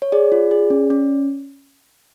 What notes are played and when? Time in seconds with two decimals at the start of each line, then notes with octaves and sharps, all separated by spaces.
0.02 C#5
0.12 G#4 D5
0.32 F4
0.51 G#4
0.70 C#4
0.90 C#4